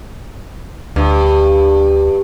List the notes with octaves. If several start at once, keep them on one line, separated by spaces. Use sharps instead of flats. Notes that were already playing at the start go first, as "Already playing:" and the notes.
D2 G2